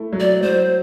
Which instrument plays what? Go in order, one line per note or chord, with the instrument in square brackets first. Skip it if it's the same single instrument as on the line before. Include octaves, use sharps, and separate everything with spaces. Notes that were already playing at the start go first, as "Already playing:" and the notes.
Already playing: [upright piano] A3 E4
F#3
[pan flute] D5
[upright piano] F#3 [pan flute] C5